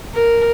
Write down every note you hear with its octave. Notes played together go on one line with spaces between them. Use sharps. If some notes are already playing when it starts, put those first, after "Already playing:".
A#4